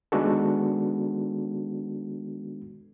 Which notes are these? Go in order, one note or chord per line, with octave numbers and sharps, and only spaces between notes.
D#3 G#3 B3 D4 F#4 A4